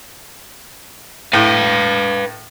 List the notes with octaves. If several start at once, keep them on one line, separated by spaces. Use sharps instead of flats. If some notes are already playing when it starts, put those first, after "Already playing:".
A2 B4 F5